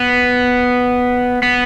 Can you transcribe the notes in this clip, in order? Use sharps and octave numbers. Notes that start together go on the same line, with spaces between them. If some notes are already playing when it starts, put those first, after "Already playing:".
Already playing: B3
B3